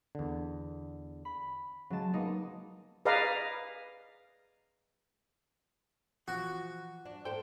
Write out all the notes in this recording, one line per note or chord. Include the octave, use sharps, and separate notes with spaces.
E2 D3
B5
C#3 F#3 G#3 A5
G#3 A#3 B3 D#4
G#4 B4 D5 D#5 F5 A#5
E3 F3 F#4
D4
A2 A4 C5 G5